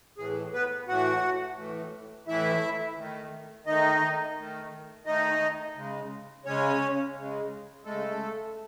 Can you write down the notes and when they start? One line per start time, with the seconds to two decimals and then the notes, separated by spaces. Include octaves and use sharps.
0.18 A2 E3 A3 G#4
0.53 B3 B4
0.88 A2 E3 A3 F#4 F#5
1.58 A2 E3 A3
2.27 A2 E3 A3 E4 E5
2.97 D#3 A3
3.66 D#3 A3 D#4 D#5
4.37 D#3 A3
5.06 D#3 A3 D#4 D#5
5.76 C#3 G#3
6.45 C#3 G#3 C#4 C#5
7.15 C#3 G#3
7.85 C#3 G#3 A3 A4